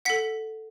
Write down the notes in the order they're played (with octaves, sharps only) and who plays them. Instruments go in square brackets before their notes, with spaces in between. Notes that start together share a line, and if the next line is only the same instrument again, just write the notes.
[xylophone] A4 F#5 B6